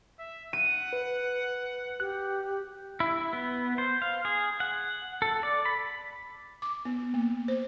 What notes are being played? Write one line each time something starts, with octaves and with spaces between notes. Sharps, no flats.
E5
F#5 D#7
B4
G4 F#6
E4
B3
C5
F5
G#4
F#5
A4
D5
B5
D6
B3
A#3
C5